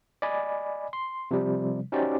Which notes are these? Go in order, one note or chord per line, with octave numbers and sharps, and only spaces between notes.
D5 D#5 G#5 B5
C6
C3 F3 G3
C#4 D#4 F#4 G4 C5 D5